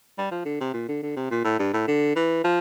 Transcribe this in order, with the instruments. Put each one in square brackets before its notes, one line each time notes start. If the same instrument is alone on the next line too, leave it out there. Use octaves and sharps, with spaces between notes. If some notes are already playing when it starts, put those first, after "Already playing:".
[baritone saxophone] G3
F3
D3
C3
A#2
D3
D3
C3
A#2
A2
G2
A2
D3
E3
F3